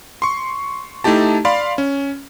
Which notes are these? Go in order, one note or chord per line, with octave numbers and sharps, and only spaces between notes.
C6 C#6
A3 D#4 E4 G4 A5
D5 F5 B5 C6
C#4